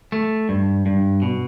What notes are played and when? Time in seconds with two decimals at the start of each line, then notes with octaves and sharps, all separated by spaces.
0.12 A3
0.49 G2
0.86 G2
1.22 B2